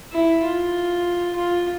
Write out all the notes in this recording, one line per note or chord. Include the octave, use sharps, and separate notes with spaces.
E4
F4
F4